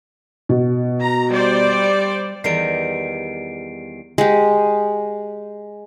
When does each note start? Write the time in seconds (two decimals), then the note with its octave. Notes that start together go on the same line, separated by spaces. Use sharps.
0.49 B2
1.02 A#5
1.31 G3 C5 D5
2.44 E2 D#3 G3 C7 D7
4.18 G#3 G4